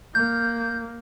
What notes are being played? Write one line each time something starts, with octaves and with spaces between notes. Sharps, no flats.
A#3 G6